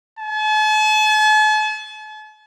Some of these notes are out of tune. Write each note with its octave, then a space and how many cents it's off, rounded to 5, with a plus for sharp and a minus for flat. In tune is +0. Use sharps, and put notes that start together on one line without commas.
A5 -45